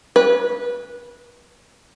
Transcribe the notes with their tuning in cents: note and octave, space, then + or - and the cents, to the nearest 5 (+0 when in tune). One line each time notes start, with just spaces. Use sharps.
B4 -20